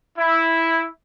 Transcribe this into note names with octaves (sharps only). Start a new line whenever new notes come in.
E4